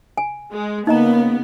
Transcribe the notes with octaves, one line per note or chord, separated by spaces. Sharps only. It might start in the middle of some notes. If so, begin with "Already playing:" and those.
G#5
G#3
C#3 A#3 B3 D#4 D#5 A#5